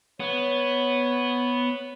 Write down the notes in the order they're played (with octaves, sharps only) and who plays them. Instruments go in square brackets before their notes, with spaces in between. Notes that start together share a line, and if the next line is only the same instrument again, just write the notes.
[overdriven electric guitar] B3 [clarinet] C#5